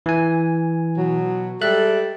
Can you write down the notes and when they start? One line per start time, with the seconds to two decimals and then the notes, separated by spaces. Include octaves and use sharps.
0.06 E3 G#5
0.98 B2 F#3
1.62 G3 G#3 A4 E5 F#6